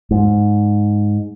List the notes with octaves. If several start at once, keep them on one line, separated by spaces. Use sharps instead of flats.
G#2